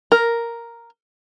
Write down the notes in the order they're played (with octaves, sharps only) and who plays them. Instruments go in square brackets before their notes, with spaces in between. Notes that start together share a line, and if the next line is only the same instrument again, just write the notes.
[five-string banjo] A#4